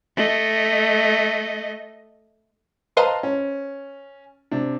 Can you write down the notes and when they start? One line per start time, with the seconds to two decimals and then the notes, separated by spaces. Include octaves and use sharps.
0.17 A3 D#5
2.97 B4 C5 D#5 F5 A5 A#5
3.23 C#4
4.51 C3 D4